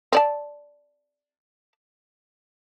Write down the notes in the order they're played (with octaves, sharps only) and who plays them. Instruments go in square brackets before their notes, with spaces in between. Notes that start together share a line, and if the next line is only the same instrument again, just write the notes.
[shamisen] C4 D5 A5